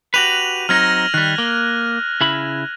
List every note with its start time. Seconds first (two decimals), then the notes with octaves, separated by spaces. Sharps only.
0.14 F#4 G4 B4 D#7 F7 F#7
0.69 F#3 C4 D#4 F6 G#6 A#6
1.14 D#3 G3 F#6
1.38 A#3
2.21 C#3 E4 B5